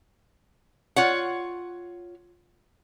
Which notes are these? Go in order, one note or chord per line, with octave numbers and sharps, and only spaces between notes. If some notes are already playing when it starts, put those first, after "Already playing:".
F4 C#5 F#5